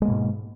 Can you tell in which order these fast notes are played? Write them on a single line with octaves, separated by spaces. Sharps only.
G#3 A#3 B2 G#2